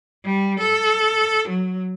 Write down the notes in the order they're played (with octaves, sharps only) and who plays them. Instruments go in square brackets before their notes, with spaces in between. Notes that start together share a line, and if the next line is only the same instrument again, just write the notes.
[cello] G3
A4
F#3